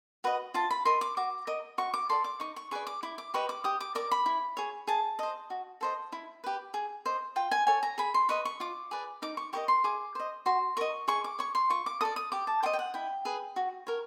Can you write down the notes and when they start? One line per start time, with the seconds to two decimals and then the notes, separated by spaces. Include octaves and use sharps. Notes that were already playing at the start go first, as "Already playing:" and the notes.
0.24 F#4 B4 D#5
0.54 F4 A5
0.70 B5
0.85 A#4 D#5 C6
1.01 D6
1.17 F#4 D6
1.47 A#4 D#5
1.78 F#4 C#6
1.94 D6
2.09 A4 D5 C6
2.24 D6
2.40 D#4 C#6
2.56 C#6
2.71 G#4 B4 D5 C#6
2.87 D6
3.03 E4 D6
3.18 D6
3.34 G4 B4 D#5 C#6
3.49 D6
3.64 G4 D#6
3.80 D6
3.95 A#4 D5 D6
4.11 B5
4.26 E4
4.57 G#4 C#5
4.87 G#4 A5
5.19 C5 D#5
5.50 F#4
5.81 A4 C5 D#5
6.12 E4
6.44 G4 B4
6.74 G#4
7.06 C5 D#5
7.36 F4 G5
7.51 G#5
7.67 A4 C#5 G#5
7.83 A#5
7.98 G#4 B5
8.14 C6
8.29 B4 D#5 C#6
8.45 C#6
8.60 F4 D6
8.91 G#4 B4 D5
9.22 D#4 D6
9.37 C#6
9.53 G4 A#4 D#5 C#6
9.68 C6
9.84 G#4 D6
10.15 C5 D#5
10.46 F#4 C6
10.77 A#4 D#5 C#6
11.08 G#4 C#6
11.24 D6
11.39 C#5 C#6
11.55 C6
11.70 F4 C#6
11.86 D6
12.01 A4 D5 D#6
12.16 D#6
12.32 G4 D6
12.47 A5
12.63 C5 D#5 G5
12.73 G5
12.79 F#5
12.94 E4 G5
13.25 G#4 B4
13.56 F#4
13.87 A#4 C#5